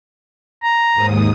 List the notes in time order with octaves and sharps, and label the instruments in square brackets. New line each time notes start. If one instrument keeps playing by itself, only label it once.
[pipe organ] A#5
[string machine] D#2 G#2 D#6